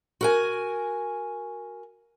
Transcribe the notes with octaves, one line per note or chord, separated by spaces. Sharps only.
F#4 A#4 G#5